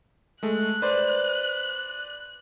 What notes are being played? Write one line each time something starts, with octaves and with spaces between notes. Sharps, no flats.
G#3 A3 F#6
B4 C5 D5